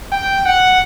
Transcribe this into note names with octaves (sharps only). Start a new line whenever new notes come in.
G5
F#5